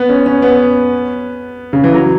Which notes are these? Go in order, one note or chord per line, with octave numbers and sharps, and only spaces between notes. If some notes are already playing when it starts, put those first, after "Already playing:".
Already playing: B3
C#4
C#4
B3
C#3
E3
F#3